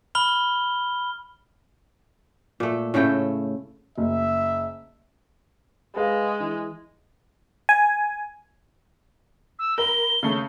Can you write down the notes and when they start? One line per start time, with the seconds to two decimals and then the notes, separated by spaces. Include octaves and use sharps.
0.15 B5 F6 G7
2.60 A#2 A3
2.94 A2 C#3 A3 G5
3.98 F#1 E5
5.96 G#3 G#4 B4 F5
6.40 E3
7.69 G#5
9.59 E6
9.78 A#4 B5 G7
10.23 C#3 A3